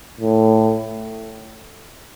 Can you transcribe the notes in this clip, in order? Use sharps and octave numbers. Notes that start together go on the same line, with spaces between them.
A2